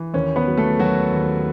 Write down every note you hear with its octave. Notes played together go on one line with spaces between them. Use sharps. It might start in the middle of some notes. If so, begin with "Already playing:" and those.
Already playing: E3
D#2 C#4
B3 B4
F#3
A3 A4
D#2 F#3 F#4
D#2